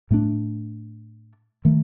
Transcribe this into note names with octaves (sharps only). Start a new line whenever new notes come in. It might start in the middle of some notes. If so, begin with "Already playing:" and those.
A2 A3 D4
D#3 A3